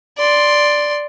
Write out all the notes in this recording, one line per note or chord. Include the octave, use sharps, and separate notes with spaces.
D5 C6